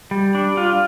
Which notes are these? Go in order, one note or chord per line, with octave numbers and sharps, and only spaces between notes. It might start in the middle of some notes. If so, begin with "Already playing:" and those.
G3
D4
F4